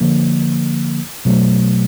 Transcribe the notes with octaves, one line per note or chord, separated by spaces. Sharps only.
D3 F3 A#3
B2 F#3 A3